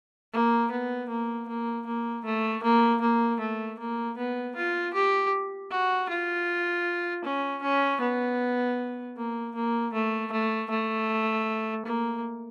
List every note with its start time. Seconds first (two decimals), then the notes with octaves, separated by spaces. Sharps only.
0.33 A#3
0.71 B3
1.09 A#3
1.48 A#3
1.87 A#3
2.25 A3
2.64 A#3
3.01 A#3
3.40 A3
3.79 A#3
4.17 B3
4.56 F4
4.94 G4
5.71 F#4
6.09 F4
7.24 C#4
7.63 C#4
8.01 B3
9.17 A#3
9.55 A#3
9.93 A3
10.32 A3
10.70 A3
11.85 A#3